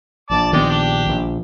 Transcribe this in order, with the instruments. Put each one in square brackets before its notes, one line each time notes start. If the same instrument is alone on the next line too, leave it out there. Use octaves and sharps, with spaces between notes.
[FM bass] A#1 [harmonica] D5 A5 D6
[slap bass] D#3 B3 [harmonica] G#3 G4 D5
[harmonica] D4 G4
[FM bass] A#1